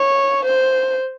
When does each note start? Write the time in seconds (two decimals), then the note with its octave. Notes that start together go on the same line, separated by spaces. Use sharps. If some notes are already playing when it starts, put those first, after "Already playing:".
Already playing: C#5
0.45 C5